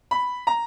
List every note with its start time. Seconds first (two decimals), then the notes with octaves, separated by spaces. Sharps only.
0.11 B5
0.47 A#5